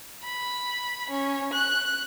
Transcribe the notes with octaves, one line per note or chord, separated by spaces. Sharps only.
B5
C#4
F#6